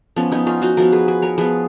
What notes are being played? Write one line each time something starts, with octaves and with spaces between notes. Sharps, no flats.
F3 B3 C#4
B3 D#4
C#4 F4
D#4 F#4
F3 B3 F#4 A#4
G#4 B4
G#4 B4
A#4 C#5
F3 B3 G#4 B4